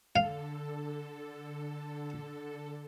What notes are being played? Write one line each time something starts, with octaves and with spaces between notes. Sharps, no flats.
D3 A4 F5